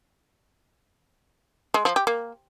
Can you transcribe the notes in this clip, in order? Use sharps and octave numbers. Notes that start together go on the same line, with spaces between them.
G#3
F3
G4
A#3